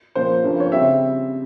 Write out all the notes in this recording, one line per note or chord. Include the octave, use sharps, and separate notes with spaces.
A#2 F3 A#3 C#4 C5
G2 F3 A#3 C#4
C#5
C#3 G3 C4 E5